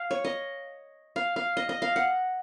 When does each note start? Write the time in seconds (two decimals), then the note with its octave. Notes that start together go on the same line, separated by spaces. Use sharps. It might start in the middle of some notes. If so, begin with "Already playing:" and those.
Already playing: F5
0.11 C#5
0.24 D#5
1.16 F5
1.36 F5
1.57 D#5
1.69 D#5
1.82 F5
1.96 F#5